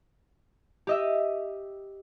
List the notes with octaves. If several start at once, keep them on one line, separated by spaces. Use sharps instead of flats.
G4 D#5 E5